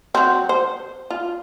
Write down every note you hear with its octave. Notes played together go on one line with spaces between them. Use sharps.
F#3 C4
C5
F4